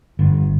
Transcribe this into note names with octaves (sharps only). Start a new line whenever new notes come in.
G1